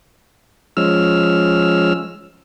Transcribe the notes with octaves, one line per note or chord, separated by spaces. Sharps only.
F3 G#3 C#4 E6 F6